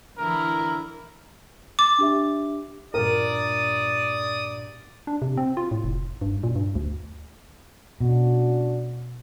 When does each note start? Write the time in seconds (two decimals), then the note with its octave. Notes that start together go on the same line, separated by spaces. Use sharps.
0.18 D3 E3 E4 A#4
1.79 D6 A6
1.98 D4 G4 E5
2.94 G2 A#2 A#4 D5 D#6
5.07 D4
5.22 C3
5.37 C4
5.57 F4
5.71 A2
5.84 F1
6.22 G2
6.43 A#2
6.56 G2
6.75 D2
8.00 B2 C#4 D4 F#4